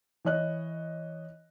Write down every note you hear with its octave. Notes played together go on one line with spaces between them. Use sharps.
E3 C#5 D#5 F#6